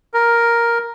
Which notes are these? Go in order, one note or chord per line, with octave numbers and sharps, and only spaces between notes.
A#4